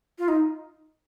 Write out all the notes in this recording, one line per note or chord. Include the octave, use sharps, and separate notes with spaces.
F4
D#4